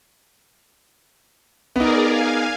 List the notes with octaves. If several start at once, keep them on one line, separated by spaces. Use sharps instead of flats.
B3 D#4 G#4 A#4 D5
F5 G#5